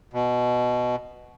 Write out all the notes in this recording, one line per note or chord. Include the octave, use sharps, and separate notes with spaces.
B2